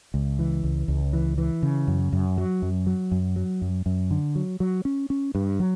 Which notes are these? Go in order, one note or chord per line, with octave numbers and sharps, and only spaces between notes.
C#2
E3
C#2
C#2
E3
E3
C#3
F#2
F#2
F#3
F#2
F#3
F#2
F#3
F#2
F#2
D3
F#3
F#3
C#4
C#4
G2
F#3